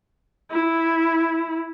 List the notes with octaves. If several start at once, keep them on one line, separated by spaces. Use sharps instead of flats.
E4